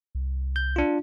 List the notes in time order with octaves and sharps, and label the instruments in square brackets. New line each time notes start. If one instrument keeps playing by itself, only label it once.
[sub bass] C2
[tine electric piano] G6
D4 F4